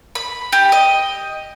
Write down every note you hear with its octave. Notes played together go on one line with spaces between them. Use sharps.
B5
G4
D#5